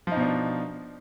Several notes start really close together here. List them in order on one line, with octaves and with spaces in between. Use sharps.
F3 D#4 B2 D4